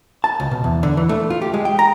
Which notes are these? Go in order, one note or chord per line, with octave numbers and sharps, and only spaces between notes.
A5
C#2
B2
E2
D3
E3
A3
F4
G4
G#3
G5
A#5